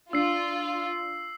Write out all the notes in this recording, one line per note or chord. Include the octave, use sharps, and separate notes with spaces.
D4 F4 E6 C7